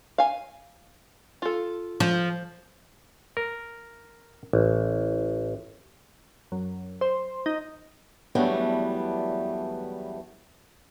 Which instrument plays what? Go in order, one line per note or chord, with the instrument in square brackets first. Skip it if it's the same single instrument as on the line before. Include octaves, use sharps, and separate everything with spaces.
[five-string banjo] F5 G#5
F4 A4
[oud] F3
[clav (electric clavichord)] A#4
A1
[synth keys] F#2
C5
D#4
[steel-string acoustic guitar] E2 F#3 G3 A3 B3 D4